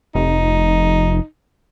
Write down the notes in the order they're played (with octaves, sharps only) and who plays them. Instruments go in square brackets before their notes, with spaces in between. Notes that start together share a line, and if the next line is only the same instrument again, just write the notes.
[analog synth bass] F1 [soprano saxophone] D#4